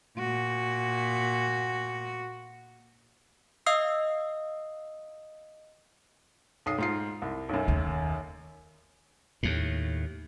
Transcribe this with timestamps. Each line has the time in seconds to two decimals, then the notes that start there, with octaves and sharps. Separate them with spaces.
0.18 A#2 F#4
3.66 D#5 F5 D#6 E6 C7
6.66 B1 D#6 C7
6.78 G#2 F4 C7
7.22 C2
7.49 B1 F#2
7.68 D#2
9.43 D#2 A2